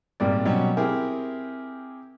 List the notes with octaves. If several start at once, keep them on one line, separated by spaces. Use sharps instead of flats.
G#1 A#2 G3 D5
B2 F#3 G3 C#4
C4 E4 G4 G#4 A#4